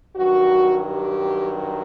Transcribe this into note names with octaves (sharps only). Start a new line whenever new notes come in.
G2 D#3 F#3 F#4
G4